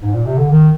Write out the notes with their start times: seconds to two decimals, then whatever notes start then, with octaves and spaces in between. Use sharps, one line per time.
0.01 G#2
0.13 A#2
0.26 C3
0.37 D3
0.50 D#3